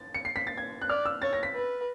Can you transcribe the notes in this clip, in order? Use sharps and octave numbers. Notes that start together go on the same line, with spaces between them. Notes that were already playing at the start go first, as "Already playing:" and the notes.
Already playing: A6
C#7
C7
B6
A6
G#6
F#6
D5 F6
E6
C#5 A6
A#6
B6
B4